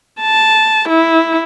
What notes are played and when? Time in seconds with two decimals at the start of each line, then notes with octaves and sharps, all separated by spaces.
0.22 A5
0.89 E4